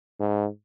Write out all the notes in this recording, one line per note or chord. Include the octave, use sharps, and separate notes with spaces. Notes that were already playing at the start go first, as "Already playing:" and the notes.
G#2